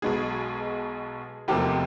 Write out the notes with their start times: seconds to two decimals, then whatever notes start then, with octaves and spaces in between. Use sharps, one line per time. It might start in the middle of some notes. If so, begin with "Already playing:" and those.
0.02 B1 B2 G#3 B3 G#4
1.48 F1 E2 C3 F3 A#3 G4